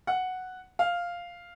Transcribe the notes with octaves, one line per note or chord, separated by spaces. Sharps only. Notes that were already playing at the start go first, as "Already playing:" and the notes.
F#5
F5